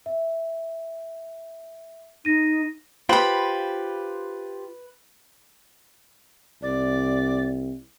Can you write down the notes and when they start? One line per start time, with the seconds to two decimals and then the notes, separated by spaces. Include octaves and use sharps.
0.06 E5
2.25 D#4 A#6 D#7
3.09 F4 G4 B4 C5 B5
6.63 C2 D5